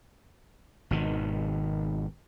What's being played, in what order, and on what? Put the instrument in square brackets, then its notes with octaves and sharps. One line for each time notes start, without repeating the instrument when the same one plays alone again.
[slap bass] G#1 B2 D#3